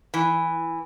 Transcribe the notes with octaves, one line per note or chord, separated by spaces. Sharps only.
E3